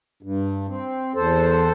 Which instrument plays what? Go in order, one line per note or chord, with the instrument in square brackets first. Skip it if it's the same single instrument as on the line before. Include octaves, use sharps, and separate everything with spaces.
[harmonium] G2
C4
E2 A4 C5